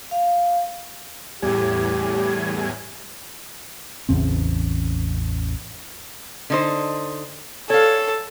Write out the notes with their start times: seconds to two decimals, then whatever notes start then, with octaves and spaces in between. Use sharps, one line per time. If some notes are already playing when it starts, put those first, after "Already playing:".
0.11 F5
1.42 E2 A2 G3 G4 G#5
4.09 A1 E2 C#3 C4
6.50 D3 D#4 C5
7.70 A4 C#5 F5